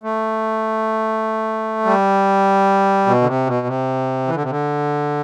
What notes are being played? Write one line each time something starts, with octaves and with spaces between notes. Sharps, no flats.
A3
G3
B2
D3
C3
B2
C3
E3
D3
C3
D3